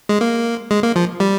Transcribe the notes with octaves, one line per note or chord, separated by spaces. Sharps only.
G#3
A#3
G#3
A#3
F3
G3